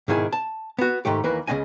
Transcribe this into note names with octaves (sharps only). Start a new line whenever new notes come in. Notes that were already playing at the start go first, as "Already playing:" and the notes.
G#2 B2 D#3 E4 G#4
A5
B3 F#4
G#2 D#3 A3 G4
D#2 E3 A#3 A#4 B4
C#2 C#3 A#3 C4 D#5 G#5